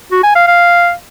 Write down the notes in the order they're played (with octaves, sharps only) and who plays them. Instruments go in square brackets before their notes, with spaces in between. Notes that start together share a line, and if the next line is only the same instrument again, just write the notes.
[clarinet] F#4
G#5
F5
F5